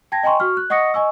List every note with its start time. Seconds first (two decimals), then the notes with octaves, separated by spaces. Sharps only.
0.12 G5 A5 G#6 A#6
0.23 D#5 G5 G#5 A#5 C6 C#6
0.40 F#4 C#6 F6
0.57 F#6
0.70 D#5 F#5 C#6 D#6 A#6 C#7
0.94 D#5 G#5 C#6 E6